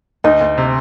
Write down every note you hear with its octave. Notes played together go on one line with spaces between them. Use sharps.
D2 D#4
D2
C3